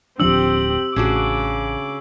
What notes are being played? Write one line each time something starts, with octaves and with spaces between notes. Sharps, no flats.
D1 F3 C4 D4 G4 E6 F#7
A1 C#3 D4 F#4 D6